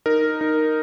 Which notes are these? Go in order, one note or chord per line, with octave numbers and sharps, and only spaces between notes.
D#4 A#4
D#4